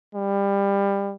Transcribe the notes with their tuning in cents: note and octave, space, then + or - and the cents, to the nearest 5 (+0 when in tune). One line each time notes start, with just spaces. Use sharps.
G3 +25